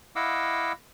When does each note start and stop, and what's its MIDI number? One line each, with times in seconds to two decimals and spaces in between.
0.16 0.72 64
0.16 0.72 75
0.16 0.72 77
0.16 0.72 78
0.16 0.72 86
0.16 0.72 88